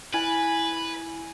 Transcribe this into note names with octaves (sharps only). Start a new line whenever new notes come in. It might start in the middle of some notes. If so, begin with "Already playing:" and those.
E4 B4 G#5